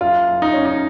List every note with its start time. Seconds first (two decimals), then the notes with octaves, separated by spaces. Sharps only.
0.01 F#1 F4
0.28 F#1
0.42 D#4
0.53 F#1 C#4
0.65 D#4